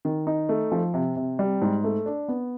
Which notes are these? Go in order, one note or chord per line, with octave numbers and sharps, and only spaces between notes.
D#3
D#4
A3
F3
C3
C3
G3
G#2
A3
D4
B3